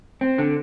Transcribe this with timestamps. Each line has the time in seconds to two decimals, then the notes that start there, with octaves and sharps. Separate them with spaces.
0.21 C4
0.38 D3